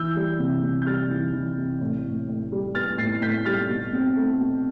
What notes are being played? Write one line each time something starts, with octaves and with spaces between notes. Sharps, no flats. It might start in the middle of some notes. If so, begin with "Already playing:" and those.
Already playing: E3 E6 G6
G3
C3
C3
G6
G3 F6 A6
E3
E3
C3
A2
A2
A2
G3
B3 F6 A6
A2 A6 C7
C7
A2 G6 B6
G3 F6 A6
B2
C4
A3
B2